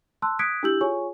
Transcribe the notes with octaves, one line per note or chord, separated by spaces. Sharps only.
A5 C6 E6 F#6
D#6 F#6 G#6 B6 C#7 D7
D4 E4 G4 E6 G6 F#7
F4 G#4 C#5 G#5 C#6